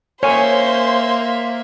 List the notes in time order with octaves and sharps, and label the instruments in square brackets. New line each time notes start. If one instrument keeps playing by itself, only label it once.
[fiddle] A#3 E5 [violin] C5 C6 [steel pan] C#5 G#5